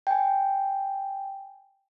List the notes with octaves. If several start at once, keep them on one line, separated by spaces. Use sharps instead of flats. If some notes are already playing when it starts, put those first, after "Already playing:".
G5 G#5